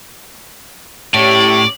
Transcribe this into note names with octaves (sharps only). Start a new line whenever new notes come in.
A2 C#4 E4 G4 C#5 D5